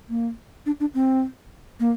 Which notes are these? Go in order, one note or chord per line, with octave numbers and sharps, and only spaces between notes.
A#3
D4
D4
C4
A#3